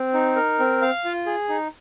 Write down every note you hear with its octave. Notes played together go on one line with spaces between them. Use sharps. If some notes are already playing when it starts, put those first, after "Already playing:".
Already playing: C4
D#4
A#4
C4
F5
F4
G#4
D#4